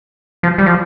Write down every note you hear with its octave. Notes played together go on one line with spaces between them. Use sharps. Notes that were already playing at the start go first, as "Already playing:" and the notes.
F3
G3
F3